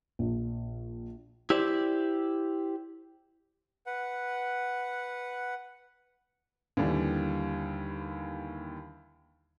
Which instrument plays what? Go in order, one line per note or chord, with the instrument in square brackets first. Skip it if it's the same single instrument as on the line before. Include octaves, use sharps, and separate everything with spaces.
[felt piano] A#1
[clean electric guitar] E4 G4 C5 D5
[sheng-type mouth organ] B4 F#5
[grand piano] D#2 D3 E3 G3